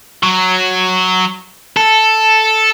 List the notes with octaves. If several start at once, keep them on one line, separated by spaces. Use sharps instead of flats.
F#3
A4